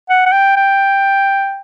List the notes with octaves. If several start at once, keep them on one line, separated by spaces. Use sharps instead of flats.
F#5
F#5
G5
G5